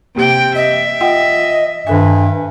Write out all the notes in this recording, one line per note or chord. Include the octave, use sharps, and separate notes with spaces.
C3 A#3 G4 G5
D#5 E5
F4 D#5 F#5 G5
G2 D#3 A4 E5 G#5